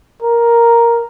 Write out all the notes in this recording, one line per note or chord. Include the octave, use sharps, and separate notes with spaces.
A#4